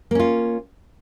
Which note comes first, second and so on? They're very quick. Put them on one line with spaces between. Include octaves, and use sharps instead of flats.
A#3 C#4 F4